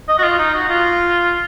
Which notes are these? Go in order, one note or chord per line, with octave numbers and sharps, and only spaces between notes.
D#5
F#4
F4
D#4
F#4
F4